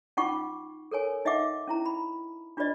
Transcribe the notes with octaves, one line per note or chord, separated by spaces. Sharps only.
C#4 D#4 F4 F#5 C#6 D6
A4 A#4 C#5 G#5
D#4 D#5 E5 F#5 D6
C#4 E4 A#5
B5
D4 F4 F#4 B4 D5 D#5